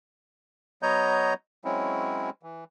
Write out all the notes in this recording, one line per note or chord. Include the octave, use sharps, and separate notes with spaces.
F#3 B3 C#5 D#5 A#5 G6
F#3 G#3 C4 C#4 E4
E3